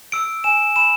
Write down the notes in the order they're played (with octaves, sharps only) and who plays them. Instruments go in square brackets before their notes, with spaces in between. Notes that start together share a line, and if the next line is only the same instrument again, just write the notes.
[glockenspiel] E6 D7
G#5 E7
B5 E7